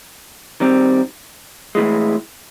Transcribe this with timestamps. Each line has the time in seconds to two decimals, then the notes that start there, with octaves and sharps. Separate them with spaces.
0.60 D#3 G3 C4
1.75 A2 E3 G#3